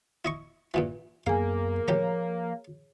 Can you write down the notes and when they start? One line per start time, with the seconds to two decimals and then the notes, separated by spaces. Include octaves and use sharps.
0.25 E4 D#5 C#6
0.74 G2 A#2 E3
1.27 F#2 A#3 B3 G#4 F5 G#5
1.88 A1 F3 G4 C#5 A#5